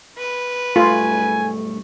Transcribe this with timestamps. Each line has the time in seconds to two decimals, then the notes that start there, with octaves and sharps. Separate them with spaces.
0.18 B4
0.76 B1 G2 A3 F4 G#5